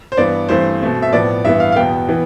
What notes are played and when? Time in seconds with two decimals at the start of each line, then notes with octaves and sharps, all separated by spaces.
0.12 C5
0.17 G2 E3 B3 D5
0.49 G2 E3 A3 C4 C5
0.81 B2 A3 C4
1.02 E5
1.13 A2 F3 B3 D5
1.45 G2 E3 B3 E5
1.60 F5
1.72 F5
1.76 E2 B2 B3 G5
2.09 E3 B3